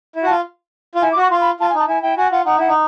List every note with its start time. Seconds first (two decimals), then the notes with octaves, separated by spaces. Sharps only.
0.16 E4
0.23 F#4
0.26 A5
0.31 F4
0.95 F4
1.02 E4 G#5
1.12 D6
1.17 F#4
1.22 C#6
1.31 F4 C6
1.41 B5
1.60 F4 A5
1.70 G#5
1.75 D#4 A5
1.88 E4 G#5
2.02 E4 G5
2.17 F#4 G#5
2.32 F4 F#5
2.45 D#4 F#5
2.58 E4 F#5
2.68 D#4